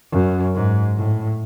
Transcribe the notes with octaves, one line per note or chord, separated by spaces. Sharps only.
F#2
G#2
A2